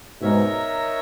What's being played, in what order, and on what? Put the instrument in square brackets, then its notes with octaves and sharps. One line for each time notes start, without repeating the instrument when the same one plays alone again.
[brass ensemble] G#2 B2 [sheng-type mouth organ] D#4 A#4 C#5 E5